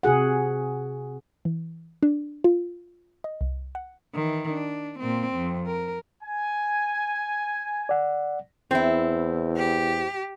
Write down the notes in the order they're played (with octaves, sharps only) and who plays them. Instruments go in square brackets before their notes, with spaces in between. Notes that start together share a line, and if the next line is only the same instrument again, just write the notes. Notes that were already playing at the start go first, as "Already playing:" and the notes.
[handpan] C3 F#4 G#4 F#5
[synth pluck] E3
D4
F4
D#5
C2
F#5
[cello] D#3 E3
D4
A#2 C4
F2
A#4
[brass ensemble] G#5
[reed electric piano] D5 F#5
[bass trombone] E2 [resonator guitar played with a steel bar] C4 E4
[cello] G4